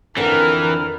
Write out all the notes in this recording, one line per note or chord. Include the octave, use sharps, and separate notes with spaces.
F2 D3 E3 A#4 F6